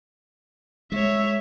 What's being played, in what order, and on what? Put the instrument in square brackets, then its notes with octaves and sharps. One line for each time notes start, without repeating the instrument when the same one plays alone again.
[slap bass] G#3 [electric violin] C#5 E5